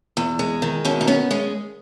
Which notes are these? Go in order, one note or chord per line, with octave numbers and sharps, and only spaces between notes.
E2
G#3
D#3
B2 C#4 E4
D#4
B3 C#4
G#3 C#4